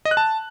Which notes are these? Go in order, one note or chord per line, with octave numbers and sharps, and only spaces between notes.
D#5
F#6
A5